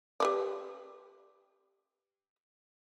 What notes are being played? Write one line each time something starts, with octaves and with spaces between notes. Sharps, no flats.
G4 B4 D5